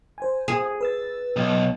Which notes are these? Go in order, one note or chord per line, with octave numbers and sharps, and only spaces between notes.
C5 G#5
G#4
B4 E6 A6
B1